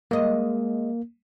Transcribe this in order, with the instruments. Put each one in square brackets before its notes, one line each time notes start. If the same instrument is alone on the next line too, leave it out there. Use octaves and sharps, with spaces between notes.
[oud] G#3 D#5 [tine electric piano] A#3